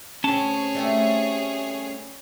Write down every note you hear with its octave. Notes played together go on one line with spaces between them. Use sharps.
D2 C4 C#4 G#4 C#5 A5
G3 A3 C4